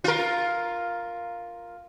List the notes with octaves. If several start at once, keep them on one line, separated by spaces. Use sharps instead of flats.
F4 A#4